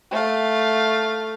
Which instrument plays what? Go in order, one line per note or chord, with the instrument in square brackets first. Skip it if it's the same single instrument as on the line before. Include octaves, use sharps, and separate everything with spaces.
[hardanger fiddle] A3 F5